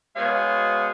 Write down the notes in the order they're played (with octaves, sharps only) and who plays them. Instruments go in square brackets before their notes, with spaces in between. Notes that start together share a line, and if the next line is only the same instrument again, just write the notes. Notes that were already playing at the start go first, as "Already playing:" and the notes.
[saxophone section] B2 G#3 G#4 C5 C#5 F5